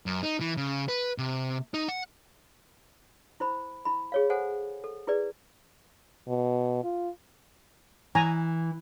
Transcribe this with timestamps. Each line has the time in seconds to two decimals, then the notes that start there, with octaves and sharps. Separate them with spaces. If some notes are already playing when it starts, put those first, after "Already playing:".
0.06 F#2
0.23 D#4
0.41 E3
0.57 C#3
0.88 B4
1.18 C3
1.74 D#4
1.88 F#5
3.40 E4 C5 B5
3.85 E4 B5
4.12 G#4 C#5 F5
4.30 A4 C5 F#5 G#5
4.84 A4
5.07 E4 G#4 B4 D5
6.28 B2
6.83 F4
8.15 E3 G#5 A#5